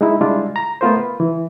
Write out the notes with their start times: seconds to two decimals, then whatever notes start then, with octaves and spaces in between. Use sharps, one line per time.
0.01 G#3 D#4 E4
0.21 G3 G#3 D4 E4 F4
0.56 A#5
0.81 A3 B3 F4 A#4 C5
0.96 B4
1.20 E3